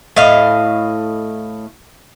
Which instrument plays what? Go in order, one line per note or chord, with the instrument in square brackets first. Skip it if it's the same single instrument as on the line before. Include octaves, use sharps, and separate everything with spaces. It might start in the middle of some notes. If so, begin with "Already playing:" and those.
[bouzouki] A2 D#5 F5